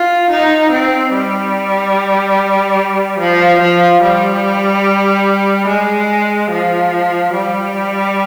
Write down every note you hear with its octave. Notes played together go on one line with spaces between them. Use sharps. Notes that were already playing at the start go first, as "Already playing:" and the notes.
Already playing: F4
D#4
C4
G3
F3
F3
G3
G#3
F3
G3